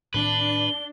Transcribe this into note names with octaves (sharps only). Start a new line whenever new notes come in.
A2 D#3 C4 D4 B4 G7